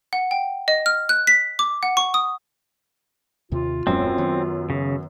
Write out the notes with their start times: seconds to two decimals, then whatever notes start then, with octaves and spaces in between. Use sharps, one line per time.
0.13 F#5
0.31 G5
0.68 D#5
0.86 F6
1.09 F#6
1.27 B6
1.59 D6
1.83 F#5
1.97 C#6
2.14 D#6
3.52 D#2 C3 F4
3.87 D#1 F#2 G#3 B3 C4
4.18 D#3 B3
4.70 C#3